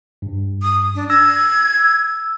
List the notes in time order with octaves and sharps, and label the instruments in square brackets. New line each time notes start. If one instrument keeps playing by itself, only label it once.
[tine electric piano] G2
[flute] D#6
D4
[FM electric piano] E6 [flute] G#6 [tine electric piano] A#6